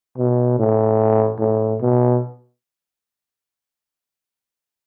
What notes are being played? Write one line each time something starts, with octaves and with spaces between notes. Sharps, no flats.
B2
A2
A2
B2